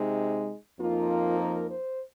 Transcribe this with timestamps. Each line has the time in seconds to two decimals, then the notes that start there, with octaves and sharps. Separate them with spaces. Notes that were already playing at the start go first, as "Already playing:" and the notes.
Already playing: C3 G#3 D#4
0.78 F2 F3 A#3 D#4 F4
1.38 A#4
1.69 C5